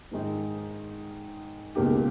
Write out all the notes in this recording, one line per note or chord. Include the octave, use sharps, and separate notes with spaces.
G#2 D#3 G#3 D#4
C#2 B2 A#3 D#4 G4